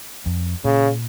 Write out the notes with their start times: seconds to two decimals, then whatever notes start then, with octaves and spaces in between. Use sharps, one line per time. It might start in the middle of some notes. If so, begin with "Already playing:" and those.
0.26 F2
0.65 A#2 C#3